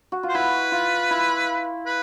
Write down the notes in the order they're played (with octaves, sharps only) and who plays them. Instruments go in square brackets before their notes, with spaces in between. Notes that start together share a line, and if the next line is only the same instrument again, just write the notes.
[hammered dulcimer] F#4
F4
[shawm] C5
[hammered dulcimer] E4 [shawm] B4
[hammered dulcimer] F4
E4
[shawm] B4